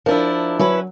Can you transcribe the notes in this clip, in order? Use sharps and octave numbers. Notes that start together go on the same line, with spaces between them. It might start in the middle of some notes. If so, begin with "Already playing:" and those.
F3 D4 E4 A#4
F#3 C#4 E4 B4